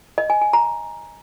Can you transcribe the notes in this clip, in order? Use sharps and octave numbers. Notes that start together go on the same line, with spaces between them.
D#5
G#5
G#5
A#5